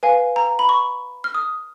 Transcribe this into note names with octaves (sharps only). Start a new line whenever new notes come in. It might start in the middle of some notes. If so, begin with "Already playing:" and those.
B4 F5 G#5
A#5
B5
C#6
F6
D#6